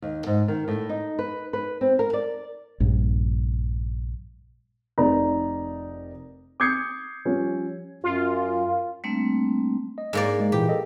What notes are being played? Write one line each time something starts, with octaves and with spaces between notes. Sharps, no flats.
D#2
G#2
D#3
A2
D#4
B4
B4
C4
A#4
D5
A#1 G2
F1 D#4 A#4 D5 A#5
D6 D#6 G6 G#6 C7 C#7
F3 G3 C#4
F#2 F4
G3 A3 A#3 C4 D4
D#5
G#2 A#3 D5
G#3
A#2 E3 G4
A4 D#5